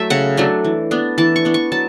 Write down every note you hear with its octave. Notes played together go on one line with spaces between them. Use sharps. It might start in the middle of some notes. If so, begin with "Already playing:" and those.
Already playing: F#3 A3 A4 E5
C#3 F#5
F#3 A3 D4
E3
B3 D4
E3 A5
C#6
B3 D4
C#6
F#3 A5